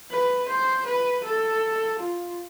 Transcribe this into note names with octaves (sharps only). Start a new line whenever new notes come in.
B4
C5
B4
A4
F4